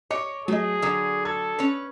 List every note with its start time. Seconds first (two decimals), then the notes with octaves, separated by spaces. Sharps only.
0.10 C#5 D#5 D6 C#7
0.48 F#3 A3 G#4 D#5
0.82 D3 F#3 D#6
1.25 A4 G#6
1.59 C#4 B4